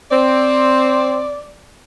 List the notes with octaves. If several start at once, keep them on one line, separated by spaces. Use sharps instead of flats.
C4 D5